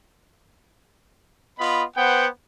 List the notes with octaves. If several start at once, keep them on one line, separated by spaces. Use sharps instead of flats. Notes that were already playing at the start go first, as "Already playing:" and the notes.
B3 F4 D#5 B5
B3 B4 C5 F#5 G5